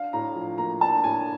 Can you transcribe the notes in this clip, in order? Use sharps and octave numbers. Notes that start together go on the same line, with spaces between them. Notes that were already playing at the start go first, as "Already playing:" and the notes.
Already playing: D4 F5
A2 A#5
F3
A#3 A#5
D4 A5
A2 G#5